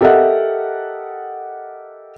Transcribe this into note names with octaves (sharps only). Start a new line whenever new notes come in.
G4 A4 A#4 D#5 E5 F#5